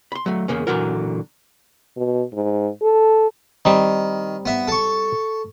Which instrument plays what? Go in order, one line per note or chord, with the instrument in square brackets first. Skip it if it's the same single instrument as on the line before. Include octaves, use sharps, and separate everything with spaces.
[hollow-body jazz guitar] B5 C6
F#3 A3
E2 C#3 A#3 C#4
A#2 D3 E3 F#3 F#4 A#4
[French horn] B2
G#2
A4
[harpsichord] D#3 [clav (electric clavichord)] G3 C4 D#4
[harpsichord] B3 E5
A4 C#6